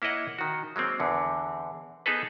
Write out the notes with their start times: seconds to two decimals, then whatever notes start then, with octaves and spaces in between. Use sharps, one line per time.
0.02 A#3 E4 C#5 D#5 F#5
0.39 D#3 F#4
0.76 F#3 G#3 A#3 C4
1.00 E2 D3
2.06 B3 D#4 G#4 A4 B4